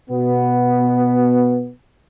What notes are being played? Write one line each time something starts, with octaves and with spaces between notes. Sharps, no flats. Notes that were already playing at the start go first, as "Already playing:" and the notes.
B2 B3